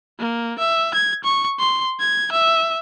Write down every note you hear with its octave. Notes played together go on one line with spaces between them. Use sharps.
A#3
E5
G#6
C#6
C6
G#6
E5